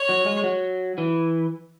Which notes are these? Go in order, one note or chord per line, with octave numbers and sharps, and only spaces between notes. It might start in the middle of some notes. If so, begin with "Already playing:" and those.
Already playing: C#5
F#3
G#3
F#3
E3